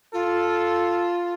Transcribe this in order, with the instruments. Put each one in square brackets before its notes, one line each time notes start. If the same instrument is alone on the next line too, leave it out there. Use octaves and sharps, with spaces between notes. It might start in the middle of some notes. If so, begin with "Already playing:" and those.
[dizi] F4 [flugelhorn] A4